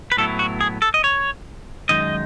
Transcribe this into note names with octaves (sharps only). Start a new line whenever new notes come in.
B4
A2 F#3 B3 E4 A4
F#4
G#4
A4
D#5
C#5
F#2 D#3 G#3 D#4 D#5